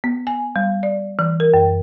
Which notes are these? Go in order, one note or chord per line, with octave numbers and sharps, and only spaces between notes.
B3
G#5
G3
D5
E3
A#4
F#2